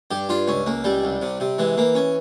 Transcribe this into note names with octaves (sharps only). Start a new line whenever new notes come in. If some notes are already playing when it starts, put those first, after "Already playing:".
G2 G4
G2 F4
C#2 C#4
C#2 A#3
C#2 G3
C2
C3
C3
E3 G#3
E3 A#3
C#4